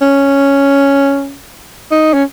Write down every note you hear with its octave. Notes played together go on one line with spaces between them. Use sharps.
C#4
D#4
C#4